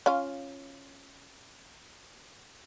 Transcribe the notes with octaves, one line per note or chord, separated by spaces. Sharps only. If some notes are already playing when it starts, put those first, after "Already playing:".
C#4 F4 F5